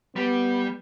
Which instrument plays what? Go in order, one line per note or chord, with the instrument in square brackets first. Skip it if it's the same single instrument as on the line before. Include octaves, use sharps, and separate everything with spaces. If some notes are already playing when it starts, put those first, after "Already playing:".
[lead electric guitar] G3 [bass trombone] B3